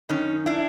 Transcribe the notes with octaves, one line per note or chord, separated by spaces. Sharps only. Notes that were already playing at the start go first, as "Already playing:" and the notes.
F#2 D#3 C#4 D#4
D4 E4